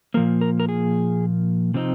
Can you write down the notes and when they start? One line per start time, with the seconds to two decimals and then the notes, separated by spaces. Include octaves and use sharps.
0.14 A#2 F3 A#3 A#4
0.41 A#4
0.60 A#4
0.69 G#4
1.74 C3 F3 C4 D#4